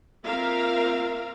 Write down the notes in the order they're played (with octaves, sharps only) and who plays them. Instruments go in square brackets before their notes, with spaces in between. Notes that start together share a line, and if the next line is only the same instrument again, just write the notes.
[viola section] A#3 C4 F4 A#4 E5 F5